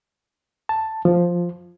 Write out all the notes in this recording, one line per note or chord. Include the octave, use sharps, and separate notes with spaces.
A5
F3